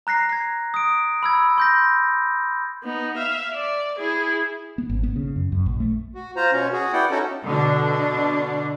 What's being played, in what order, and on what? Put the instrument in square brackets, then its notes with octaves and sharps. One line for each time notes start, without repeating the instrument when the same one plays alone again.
[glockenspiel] A#5 F#6 A#6 C7
G#6 C7
D#6 D7
B5 E6 G#6
C6 G6 A#6
[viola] B3 D#4
E5 F5
D5
E4 G#4
[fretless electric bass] B3
G#1
B3
C#3
F#2
F#2
A#1
A3
[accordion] F#4
F4 C5 A#5
B2 C#4
F#4 G#4
B3 E4 D5 F#5 G5
C#4 D#4 F#4 A4
[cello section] B2 D3 D4